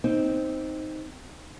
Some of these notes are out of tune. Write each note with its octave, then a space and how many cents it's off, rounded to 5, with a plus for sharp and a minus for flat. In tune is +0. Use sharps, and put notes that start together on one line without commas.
C4 +0 D#4 +5